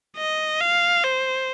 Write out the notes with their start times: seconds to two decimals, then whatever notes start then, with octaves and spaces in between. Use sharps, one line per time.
0.17 D#5
0.61 F5
1.04 C5